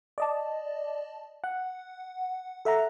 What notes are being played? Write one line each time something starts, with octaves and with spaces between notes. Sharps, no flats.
D5 D#5 A5
F#5
A4 E5 F#5 A#5